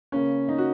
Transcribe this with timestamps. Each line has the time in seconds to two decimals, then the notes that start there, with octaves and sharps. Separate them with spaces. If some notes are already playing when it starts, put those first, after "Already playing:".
0.12 C#3 A#3 C#4
0.48 D#4
0.58 F#4